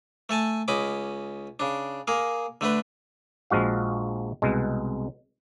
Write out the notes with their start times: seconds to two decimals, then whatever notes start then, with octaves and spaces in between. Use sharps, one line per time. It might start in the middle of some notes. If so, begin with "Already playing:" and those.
0.29 A3 A4 G#5 A5
0.68 C#2 C#4 D#5 B5 D6
1.60 C#3 D4
2.07 A#3 G#4 A#4
2.61 D3 A3 D4 B4
3.50 A#1 F3 G#3 F#4 F5
4.42 C2 B2 G#3